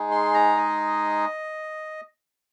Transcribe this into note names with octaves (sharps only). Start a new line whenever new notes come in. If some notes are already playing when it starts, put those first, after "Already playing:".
Already playing: G#3 D#4 G#4
C6
A#5
D#5